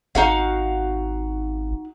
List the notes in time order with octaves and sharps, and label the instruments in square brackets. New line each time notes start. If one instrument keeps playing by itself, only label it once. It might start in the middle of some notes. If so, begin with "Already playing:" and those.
[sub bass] G#1 [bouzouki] D#4 F#4 F5